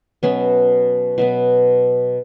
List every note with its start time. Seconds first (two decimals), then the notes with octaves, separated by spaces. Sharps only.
0.23 B2 F#3 B3 C#4
1.18 B2 F#3 B3